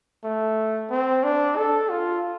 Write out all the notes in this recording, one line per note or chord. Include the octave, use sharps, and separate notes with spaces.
A3
C4
D4
A4
F4